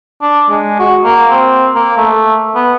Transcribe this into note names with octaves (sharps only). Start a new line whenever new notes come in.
D4
G#3
F#4
A#3
C4
A#3
A3
B3